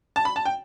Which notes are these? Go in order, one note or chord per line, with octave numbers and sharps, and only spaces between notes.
A5
B5
A5
G5